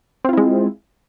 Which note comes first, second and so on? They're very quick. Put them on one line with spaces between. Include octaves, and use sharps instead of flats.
C4 F4 E4 G#3